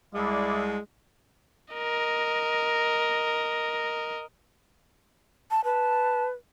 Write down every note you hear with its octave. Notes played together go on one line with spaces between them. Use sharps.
C2 G#3 E4 D5
A#4 D#5
A5
B4 A5